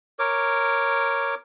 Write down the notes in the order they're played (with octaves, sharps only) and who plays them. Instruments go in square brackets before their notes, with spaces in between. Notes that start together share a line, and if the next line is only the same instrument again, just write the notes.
[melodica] A#4 C#5 D6